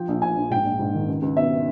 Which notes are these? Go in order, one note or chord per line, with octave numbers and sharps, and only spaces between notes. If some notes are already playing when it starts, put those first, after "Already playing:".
Already playing: F3 G5
A#1
A#1 G#5
A#1
G#2 G5
A#1
G#2
D#3
C#2
C#2
B2 E5